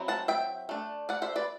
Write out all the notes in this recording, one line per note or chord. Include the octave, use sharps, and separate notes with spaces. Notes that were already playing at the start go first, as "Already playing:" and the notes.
Already playing: F#3 C4 E4
F#5 A5
E5 G5
A3 D4
D5 F#5
C5 E5
B4 D5